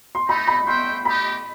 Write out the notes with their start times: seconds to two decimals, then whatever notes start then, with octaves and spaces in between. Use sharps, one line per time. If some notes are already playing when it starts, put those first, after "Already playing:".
0.15 C6
0.28 A3 C4 D#4 B5
0.47 B5
0.66 F#4 C5 E5 G5 C6
1.05 A3 D#4 G4 D#5 B5